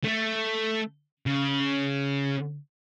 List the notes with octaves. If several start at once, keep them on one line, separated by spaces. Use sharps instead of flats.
A3 A4
C#3